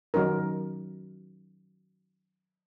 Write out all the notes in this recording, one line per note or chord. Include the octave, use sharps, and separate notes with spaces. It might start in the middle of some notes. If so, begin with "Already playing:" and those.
D#3 F#3 C#4 D#4 A#4